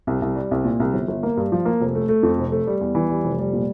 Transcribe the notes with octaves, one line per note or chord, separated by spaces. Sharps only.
C2
C2
G3
C2
A#2
C2
G1
G1
A#3
G2
F3
A#3
F1
A3
A3
F2
F1
A3
G3
E2
E3
G3
F1
G3
A#2